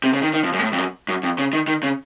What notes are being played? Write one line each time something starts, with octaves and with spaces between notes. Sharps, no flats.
C3
C#3
D#3
D#3
F2
F#2
A#2
A2
F2
F#2
F#2
F2
C#3
D#3
D#3
C#3